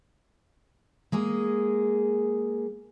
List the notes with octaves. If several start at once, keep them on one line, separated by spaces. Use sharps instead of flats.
G#3 A#3 G#4